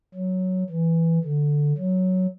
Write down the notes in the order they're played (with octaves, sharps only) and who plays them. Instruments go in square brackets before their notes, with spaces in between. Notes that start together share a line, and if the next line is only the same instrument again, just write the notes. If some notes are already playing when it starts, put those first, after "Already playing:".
[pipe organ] F#3
E3
D3
F#3